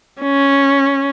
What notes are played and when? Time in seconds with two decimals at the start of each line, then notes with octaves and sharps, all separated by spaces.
0.22 C#4